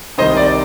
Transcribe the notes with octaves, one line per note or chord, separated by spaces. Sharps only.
C2 C3 D#3 C5 D#5
D5